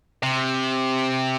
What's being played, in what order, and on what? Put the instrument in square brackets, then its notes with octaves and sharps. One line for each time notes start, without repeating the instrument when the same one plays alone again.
[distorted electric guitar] C3